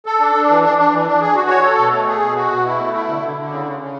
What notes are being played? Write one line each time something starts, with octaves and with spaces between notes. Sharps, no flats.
A4
D4
D4
E3
D4
D4
E3
D4
G#4
F#4
C#5
A4
B2
A3
G#4
B2
F#4
B2
E4
A3
E4
D3
D3
D3
C#3
C#3
C#3